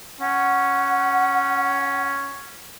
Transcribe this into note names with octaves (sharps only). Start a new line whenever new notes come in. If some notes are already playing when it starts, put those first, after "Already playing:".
C#4 F#5